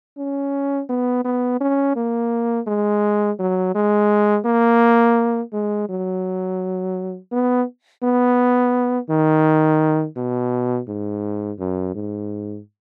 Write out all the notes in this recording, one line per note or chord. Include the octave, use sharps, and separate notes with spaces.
C#4
B3
B3
C#4
A#3
G#3
F#3
G#3
A#3
G#3
F#3
B3
B3
D#3
B2
G#2
F#2
G#2